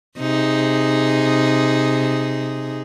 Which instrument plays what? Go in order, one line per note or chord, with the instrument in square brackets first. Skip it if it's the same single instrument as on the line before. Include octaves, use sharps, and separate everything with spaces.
[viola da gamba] C3 D#4 G#4